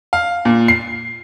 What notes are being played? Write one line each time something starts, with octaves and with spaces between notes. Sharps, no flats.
F5
A#2
C7